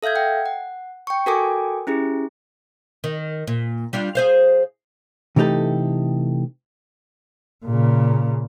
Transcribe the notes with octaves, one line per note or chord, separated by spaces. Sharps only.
A4 E5 F5 G6 G#6
F#5 G5
F#5
G5 C#6
F#4 A4 A#4 G5 G#5 D6
C#4 E4 G4 G#4
D#3
A#2
G3 D4 F4
G#4 C5 F5
C3 E3 A3 D#4 G4 A4
A#2 C#3